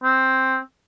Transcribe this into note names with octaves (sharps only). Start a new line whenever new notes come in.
C4